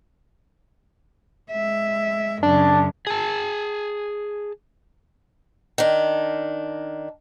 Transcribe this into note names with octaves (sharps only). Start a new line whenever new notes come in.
G#3 E5
F#2 C#3 D4
G#4 A5
D#3 D4